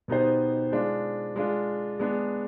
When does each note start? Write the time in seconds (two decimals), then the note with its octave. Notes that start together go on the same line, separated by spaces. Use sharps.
0.08 B2 B3 D#4 G4 C5
0.72 G#3 D4 F4
1.36 G#3 D4 F4
1.99 G#3 B3 D4